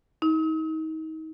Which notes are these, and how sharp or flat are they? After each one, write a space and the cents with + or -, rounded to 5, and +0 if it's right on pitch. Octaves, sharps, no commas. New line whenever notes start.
D#4 +30